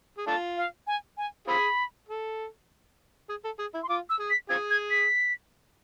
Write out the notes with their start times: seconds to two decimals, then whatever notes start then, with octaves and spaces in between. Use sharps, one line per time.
0.18 G#4
0.26 A3 D4 F4 A5
0.57 F5
0.87 G#5
1.17 G#5
1.48 C4 F4 G#4 B5
2.09 A4
3.29 G#4
3.44 A4
3.59 G#4
3.75 E4
3.83 C6
3.89 F4 D6
4.10 E6
4.20 G#4
4.30 B6
4.49 C4 F4 G#4 G#6
4.70 G#6
4.91 B6